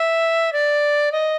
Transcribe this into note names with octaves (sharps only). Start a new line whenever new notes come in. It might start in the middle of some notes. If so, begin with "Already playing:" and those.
Already playing: E5
D5
D#5